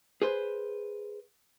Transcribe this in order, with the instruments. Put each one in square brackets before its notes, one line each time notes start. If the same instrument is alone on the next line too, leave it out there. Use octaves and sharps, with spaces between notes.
[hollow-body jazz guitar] G#4 B4 C5